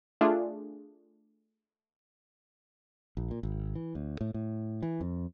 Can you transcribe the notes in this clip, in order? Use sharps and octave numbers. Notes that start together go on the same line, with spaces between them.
A3 D4 F4 G#4
A#1
A#2
G#1
E3
D2
A2
A2
E3
F2